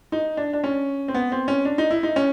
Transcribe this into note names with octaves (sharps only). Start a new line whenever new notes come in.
D#4
D4
D4
C#4
C4
B3
C4
C#4
D4
D#4
E4
D#4
C#4